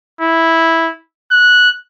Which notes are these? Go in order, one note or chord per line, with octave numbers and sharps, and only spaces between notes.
E4
F#6